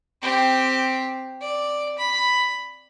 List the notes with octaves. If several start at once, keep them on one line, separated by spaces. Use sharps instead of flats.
C4 G4
D5
B5